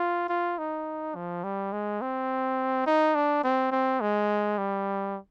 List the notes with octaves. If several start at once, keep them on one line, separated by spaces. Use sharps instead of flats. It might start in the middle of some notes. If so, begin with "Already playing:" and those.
Already playing: F4
F4
D#4
F3
G3
G#3
C4
D#4
D4
C4
C4
G#3
G3